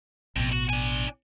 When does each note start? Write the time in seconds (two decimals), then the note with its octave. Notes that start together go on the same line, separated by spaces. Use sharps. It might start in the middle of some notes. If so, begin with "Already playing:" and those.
0.36 A1 F2 B2
0.52 F#4
0.70 D4 G#5